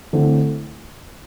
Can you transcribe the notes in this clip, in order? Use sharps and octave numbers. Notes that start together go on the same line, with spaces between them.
D3 A3 C4 E4